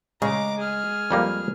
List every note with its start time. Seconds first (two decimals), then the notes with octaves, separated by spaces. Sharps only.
0.22 C#3 G#3 A#5 D6
0.59 G#4 F6
1.11 F2 G3 A#3